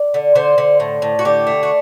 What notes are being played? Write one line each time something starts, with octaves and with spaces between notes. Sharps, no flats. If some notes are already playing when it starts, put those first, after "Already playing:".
Already playing: D5
D3
D3 C5
D3
A2
A2
F#4
D3 G4
A3
F#4